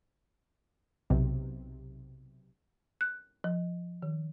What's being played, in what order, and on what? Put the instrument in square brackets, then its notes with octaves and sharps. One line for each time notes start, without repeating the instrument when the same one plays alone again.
[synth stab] B1 C3
[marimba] F#6
F3
D#3